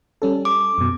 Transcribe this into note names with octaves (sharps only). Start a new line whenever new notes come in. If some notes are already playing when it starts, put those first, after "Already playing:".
G3 C#4 A4
D6
F#2 B2